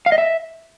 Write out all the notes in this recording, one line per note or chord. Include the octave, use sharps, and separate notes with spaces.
F5
D#5
E5